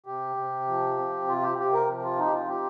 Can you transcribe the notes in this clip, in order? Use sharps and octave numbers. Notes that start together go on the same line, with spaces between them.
C3 G4
C3
F3
C4
C3 F4
G4
C3 G4
A#4
F3
F4
C4 D#4
G4
F4
G4